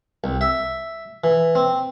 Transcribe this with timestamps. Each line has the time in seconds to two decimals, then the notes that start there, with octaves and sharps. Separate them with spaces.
0.24 C2
0.41 E5
1.24 E3
1.55 C4